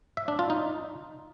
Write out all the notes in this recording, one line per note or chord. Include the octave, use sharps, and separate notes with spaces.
E5
D4
F4
D#4